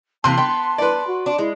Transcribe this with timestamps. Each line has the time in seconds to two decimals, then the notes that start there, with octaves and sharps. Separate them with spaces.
0.24 C3 E3 A#3 A5 C6
0.38 B3 G5
0.78 B4 D5
1.07 F#4
1.26 D4
1.38 G#3 E4